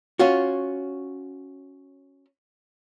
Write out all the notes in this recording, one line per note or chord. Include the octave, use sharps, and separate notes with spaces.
C#4 F4 F#4